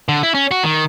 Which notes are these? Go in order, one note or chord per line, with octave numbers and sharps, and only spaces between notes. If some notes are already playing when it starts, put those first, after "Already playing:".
D3
E4
C#4
F#4
D#3